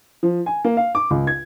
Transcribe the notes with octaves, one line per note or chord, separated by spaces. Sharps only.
F3
G#5
A#3
F5
D6
C#2
G#6